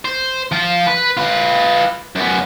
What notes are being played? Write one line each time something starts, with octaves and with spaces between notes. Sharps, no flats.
C5
F3 F4
B4
F4 B4
F#2 B3